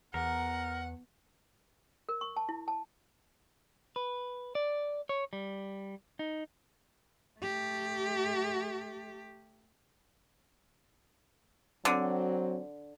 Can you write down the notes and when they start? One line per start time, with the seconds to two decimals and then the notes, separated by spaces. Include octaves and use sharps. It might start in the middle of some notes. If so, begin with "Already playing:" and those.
0.14 E2 A#4 F#5
2.09 A#4
2.21 C#6
2.37 A5
2.49 E4
2.68 A5
3.96 B4
4.55 D5
5.09 C#5
5.33 G3
6.19 D#4
7.41 A3 G4
11.85 D3 F#3 C4